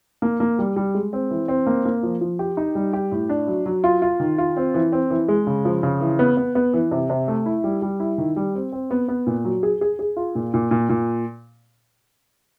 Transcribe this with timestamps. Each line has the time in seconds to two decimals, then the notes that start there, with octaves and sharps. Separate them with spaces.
0.22 A#3
0.40 A#3
0.59 G3
0.76 G3
0.94 G#3
1.13 C4
1.30 E3
1.48 C4
1.67 A#3
1.85 A#3
2.03 F3
2.21 F3
2.39 G4
2.57 D#4
2.75 G3
2.93 G4
3.12 A2
3.29 D4
3.47 F#3
3.66 F#3
3.84 F4
4.02 F4
4.20 D#3
4.38 F4
4.57 C4
4.74 E3
4.92 C4
5.11 E3
5.28 G#3
5.47 C#3
5.65 F3
5.83 C#3
6.01 E3
6.19 B3
6.37 B3
6.55 B3
6.73 E3
6.91 C3
7.10 C3
7.28 A3
7.46 E4
7.64 G3
7.82 G3
8.00 E4
8.18 D#3
8.36 G3
8.55 C4
8.72 C4
8.91 B3
9.08 B3
9.27 A#2
9.45 F#3
9.63 G#4
9.81 G#4
9.99 G#4
10.17 F4
10.35 A#2
10.54 A#2
10.71 A#2
10.89 A#2